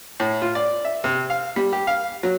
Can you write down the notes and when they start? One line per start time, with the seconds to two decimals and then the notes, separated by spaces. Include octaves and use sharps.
0.20 A2
0.42 F4
0.55 D5
0.85 E5
1.04 C3
1.30 F5
1.56 G3
1.73 G4
1.87 F5
2.23 F#3